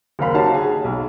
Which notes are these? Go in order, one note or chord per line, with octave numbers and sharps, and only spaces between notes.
F#1 D#2 A#4 C5 F5 B5
D#4 F#4 G4 C#5 F5 A5
G#4
B1